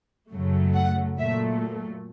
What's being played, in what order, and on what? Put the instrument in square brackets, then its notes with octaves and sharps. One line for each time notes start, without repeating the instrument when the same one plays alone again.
[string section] F#2 C#3 F#3 A3
F#5
A#2 F#3 A3 E5